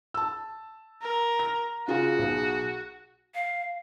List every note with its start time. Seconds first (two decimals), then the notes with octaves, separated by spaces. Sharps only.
0.14 A5 E6
1.02 A#4
1.39 A#6
1.88 C#3 F4 F#4 G#4
2.19 B1 G#4
3.35 F5